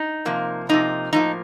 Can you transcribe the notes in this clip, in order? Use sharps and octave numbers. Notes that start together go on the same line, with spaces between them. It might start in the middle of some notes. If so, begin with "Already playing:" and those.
Already playing: D#4
C3 F3 A#3
C3 F3 A#3 D#4
A2 F3 A#3 D#4